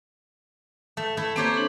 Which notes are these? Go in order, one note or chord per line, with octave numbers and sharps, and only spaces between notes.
A3
A3 E4
A#3 C4 G4 C5 C#5 A#5
D4 A4